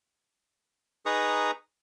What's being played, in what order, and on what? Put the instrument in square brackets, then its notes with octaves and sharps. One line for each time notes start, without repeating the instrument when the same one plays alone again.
[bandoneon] D#4 G#4 B4 A#5 C#6 D#6